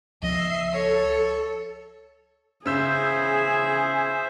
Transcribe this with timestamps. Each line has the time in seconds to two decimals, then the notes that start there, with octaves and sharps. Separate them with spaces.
0.22 C#2 F3 D#5 E5 C7
0.72 A4 C#5
2.66 C#3 G#4 C5 E5 E6 G6